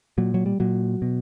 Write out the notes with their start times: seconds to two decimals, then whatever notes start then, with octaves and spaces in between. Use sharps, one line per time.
0.18 A#2 F#3
0.34 F#3
0.46 G3
0.60 A#2 F#3
1.02 B2